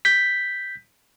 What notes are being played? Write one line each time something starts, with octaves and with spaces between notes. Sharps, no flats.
G6 B6